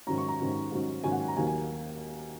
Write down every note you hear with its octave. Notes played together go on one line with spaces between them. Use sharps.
G#2 D#3 F#3 C#4 A#5
C#6
A#5
G#2 D#3 F#3 C#4
G#2 D#3 F#3 C#4
G#2 D#3 F#3 C#4 G#5
F#5
G#5
A#5
D#2 D#3 F#3 A#3 G#5
G#5